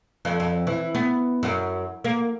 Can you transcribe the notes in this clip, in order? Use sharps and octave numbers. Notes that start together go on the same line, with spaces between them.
F2
F2
E3
B3
F#2
A#3